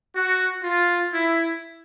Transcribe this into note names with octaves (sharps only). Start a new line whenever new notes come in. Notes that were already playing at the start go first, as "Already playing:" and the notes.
F#4
F4
E4